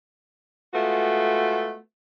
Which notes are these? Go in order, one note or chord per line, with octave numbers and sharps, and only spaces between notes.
G#3 A3 B3 F4 F#4